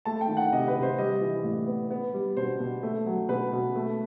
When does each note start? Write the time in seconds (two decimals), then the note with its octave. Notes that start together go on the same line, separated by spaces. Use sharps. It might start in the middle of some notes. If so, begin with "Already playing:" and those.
0.05 A3 A5
0.21 G5
0.29 D#3
0.37 F#5
0.52 C3 D#5
0.68 B4
0.75 C3
0.83 C5
0.98 G3 D#5
1.21 E3
1.44 A2
1.67 B3
1.91 B3
2.13 G3
2.37 B2 C5
2.60 B2
2.83 A3
3.06 F#3
3.29 B2 B4
3.52 B2
3.76 A3